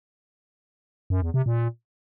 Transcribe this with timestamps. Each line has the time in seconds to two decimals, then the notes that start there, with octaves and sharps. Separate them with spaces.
1.10 F#2
1.22 E2
1.34 C3
1.46 A#2